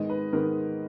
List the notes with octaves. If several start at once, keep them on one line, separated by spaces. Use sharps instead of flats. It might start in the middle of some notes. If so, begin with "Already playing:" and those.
Already playing: G#2 D#3 G#3 B3 D#5
B4
G#2 D#3 G#3 B3 A#4